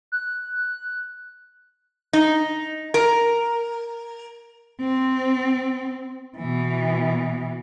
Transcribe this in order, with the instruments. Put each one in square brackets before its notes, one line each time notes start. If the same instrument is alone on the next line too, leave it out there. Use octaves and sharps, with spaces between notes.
[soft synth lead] F#6
[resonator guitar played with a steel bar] D#4
A#4
[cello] C4
B2 E3